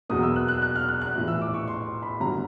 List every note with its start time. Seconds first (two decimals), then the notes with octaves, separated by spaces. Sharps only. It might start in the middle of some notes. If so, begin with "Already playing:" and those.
0.09 E2 B2 F#3 A#3 D#6
0.23 E6
0.36 F#6
0.48 F#6
0.62 F#6
0.76 F6
0.89 F#6
1.01 F#6
1.15 A#1 A2 E3
1.28 E6
1.42 D6
1.54 C#6
1.68 C6
2.03 B5
2.20 G1 G2 D3 F#3 A#5